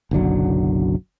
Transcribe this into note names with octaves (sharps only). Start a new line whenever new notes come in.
F#1 B1 D3 F#3